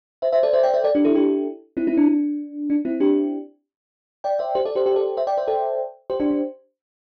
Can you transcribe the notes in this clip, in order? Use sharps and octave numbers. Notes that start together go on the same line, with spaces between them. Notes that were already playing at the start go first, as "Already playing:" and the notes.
C5 E5
C5 E5
A4 D5
C5 E5
D5 G5
C5 E5
A4 D5
D4 G4
E4 A4
D4 G4
C4 E4
C4 E4
D4
D4
D4
C4 E4
D4 G4
D5 G5
C5 E5
G4 C5
A4 D5
G4 C5
G4 C5
A4 D5
C5 E5
D5 G5
C5 E5
A4 D5
G4 C5
D4 G4
D4